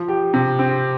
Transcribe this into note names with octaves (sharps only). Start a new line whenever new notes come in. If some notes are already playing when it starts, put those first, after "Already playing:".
Already playing: F3
G4
C3
C4